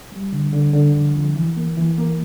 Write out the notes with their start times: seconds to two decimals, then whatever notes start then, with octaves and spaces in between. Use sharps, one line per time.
0.12 G3
0.32 D3
0.53 D3
0.74 D3
0.95 F2
1.15 F2
1.36 E3
1.57 A#3
1.77 E3
1.98 A#3